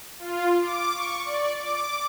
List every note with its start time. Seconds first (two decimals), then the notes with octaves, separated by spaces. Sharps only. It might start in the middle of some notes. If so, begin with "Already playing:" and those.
0.19 F4
0.61 D6
0.94 C#6
1.25 D5
1.59 D6